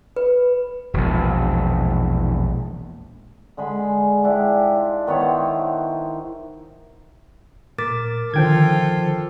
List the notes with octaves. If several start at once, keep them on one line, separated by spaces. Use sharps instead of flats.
B4
E1 A#1
D3 G#3 G#4 B5
G#2 D4 E4 G4
F4
D#3 B3 E4 C#5
C5
A#2 A#4 D6 A6
D3 D#3 F3 F4 A4 G5 G6 G#6